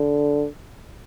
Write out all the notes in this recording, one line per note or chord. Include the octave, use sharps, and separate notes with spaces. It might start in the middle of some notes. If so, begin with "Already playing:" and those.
Already playing: D3